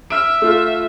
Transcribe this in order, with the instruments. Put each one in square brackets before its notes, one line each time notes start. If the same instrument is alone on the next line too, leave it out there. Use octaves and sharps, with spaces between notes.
[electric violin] E5 [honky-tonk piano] F6 D7
[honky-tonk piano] A3 F4